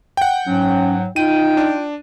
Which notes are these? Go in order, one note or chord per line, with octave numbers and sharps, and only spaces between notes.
F#5 G5
G#2 F#3 C#4
D#4 F4 G5 D#7
D4